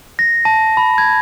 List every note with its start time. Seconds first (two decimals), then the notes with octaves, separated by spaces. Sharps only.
0.19 A#6
0.45 A5
0.77 B5
0.98 G#6